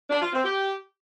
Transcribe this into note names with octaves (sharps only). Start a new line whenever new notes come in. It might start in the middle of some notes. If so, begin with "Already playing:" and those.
D4
F4
C4
G4